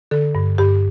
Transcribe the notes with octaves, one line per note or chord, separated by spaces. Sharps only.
D3 A4
G2
G2 G4